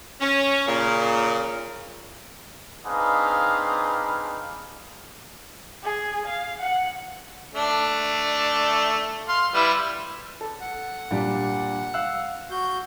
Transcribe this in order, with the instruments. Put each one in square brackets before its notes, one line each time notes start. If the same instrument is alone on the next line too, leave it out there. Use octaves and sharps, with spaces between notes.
[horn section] C#4
A#2 C#3
[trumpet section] C4 D4 D#4 G#4 B4 F5
[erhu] G#4
F5
F#5
[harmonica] A3 D4
F5 C6
G3 E4 B4
[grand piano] A4
[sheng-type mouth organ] F#5
[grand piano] A#2 G3 D4
F5 E6 F#6
[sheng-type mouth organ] F#4 G6